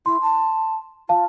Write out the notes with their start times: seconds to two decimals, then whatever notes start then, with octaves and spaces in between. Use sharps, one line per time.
0.06 E4 C6
0.22 A5
1.09 F4 F5 A5